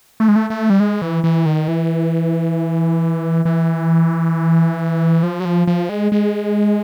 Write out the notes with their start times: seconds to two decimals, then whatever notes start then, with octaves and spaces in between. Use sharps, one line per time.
0.20 A3
0.28 G#3
0.36 A3
0.50 A3
0.70 G3
0.80 G#3
1.02 E3
1.24 E3
1.46 D#3
1.68 E3
3.45 E3
5.23 F3
5.40 F#3
5.45 F3
5.67 F3
5.89 G#3
6.12 G#3